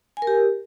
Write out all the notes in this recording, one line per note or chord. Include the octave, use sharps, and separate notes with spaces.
G#5
A#4
G4